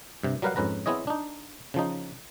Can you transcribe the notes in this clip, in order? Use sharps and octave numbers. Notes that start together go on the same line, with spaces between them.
G2 C3
F#3 G3 A#4 B4 F5 F#5
F2 G#2 C#4 B4 A#5
B3 C4 E4 G#4 C#5 D#5
D4 D#4
C#3 F3 D#4